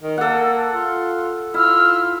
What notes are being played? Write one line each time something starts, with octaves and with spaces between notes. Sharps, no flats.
D#3
A#3 A4 F#5
F4
E4 F4 E6 F6